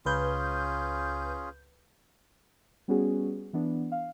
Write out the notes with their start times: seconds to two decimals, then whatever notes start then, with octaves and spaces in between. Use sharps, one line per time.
0.06 C#2 C#4 F4 G#4 B4 G6
2.88 G3 B3 C#4 F#4 G#4
3.53 E3 B3 D4
3.92 F5